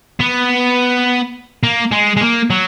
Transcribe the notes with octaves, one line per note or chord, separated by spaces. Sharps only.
B3
A#3
G#3
G#3
A#3
F#3